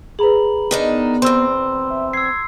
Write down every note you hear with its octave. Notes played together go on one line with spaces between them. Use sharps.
G#4 B4 A#5 B5 F#7
D#3 B3 D4 D#4
E2 C4 C6 E6
E5
E6 G#6 C7